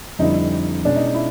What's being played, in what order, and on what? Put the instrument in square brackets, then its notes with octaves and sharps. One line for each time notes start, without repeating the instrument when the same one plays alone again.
[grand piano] F2 D3 G3 C4 E4 [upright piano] D#4
[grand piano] B2 G#3 C#4 [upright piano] D4
[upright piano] D#4
D#4
E4